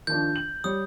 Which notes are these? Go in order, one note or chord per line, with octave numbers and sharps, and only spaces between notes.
D#3 F3 D4 G6
F#7
G3 C#5 D#6